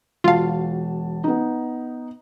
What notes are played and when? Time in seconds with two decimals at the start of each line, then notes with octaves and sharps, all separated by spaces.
0.24 E1 F4 F#4 F5 A5
1.24 B3 D#4